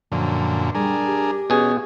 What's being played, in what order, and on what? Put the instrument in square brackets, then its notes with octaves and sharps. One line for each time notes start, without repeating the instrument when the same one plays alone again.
[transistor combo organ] F#2 A#2 D3 [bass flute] F3
[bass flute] G3 [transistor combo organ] D4 G#4 A#4
[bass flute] G4
[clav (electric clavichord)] B2 G#4 [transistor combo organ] C#4